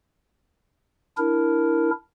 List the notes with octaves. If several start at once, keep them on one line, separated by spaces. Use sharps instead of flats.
D4 E4 A#4